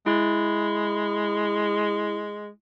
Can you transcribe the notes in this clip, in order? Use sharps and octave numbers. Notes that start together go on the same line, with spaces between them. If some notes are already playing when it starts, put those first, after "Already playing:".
G#3 E4